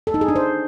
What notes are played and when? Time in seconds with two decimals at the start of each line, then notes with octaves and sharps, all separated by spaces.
0.07 A4
0.14 D#4
0.21 G#4
0.28 D4
0.36 C5